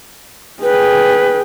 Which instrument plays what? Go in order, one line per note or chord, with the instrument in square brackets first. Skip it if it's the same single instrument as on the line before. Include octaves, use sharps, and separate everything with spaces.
[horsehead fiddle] G#4 G5 [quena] B4